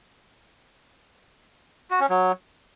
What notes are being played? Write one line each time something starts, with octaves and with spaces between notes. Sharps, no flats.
F#4
C#4
F#3